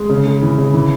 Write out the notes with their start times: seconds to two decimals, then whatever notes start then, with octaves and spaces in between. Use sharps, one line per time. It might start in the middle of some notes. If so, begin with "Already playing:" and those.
Already playing: G#3
0.09 C#3
0.26 G#3
0.42 E3
0.58 C#3
0.74 E3